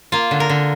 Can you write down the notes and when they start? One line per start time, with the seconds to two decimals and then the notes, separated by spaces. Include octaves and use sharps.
0.12 A#3 F4
0.31 D3
0.40 A#4
0.49 D3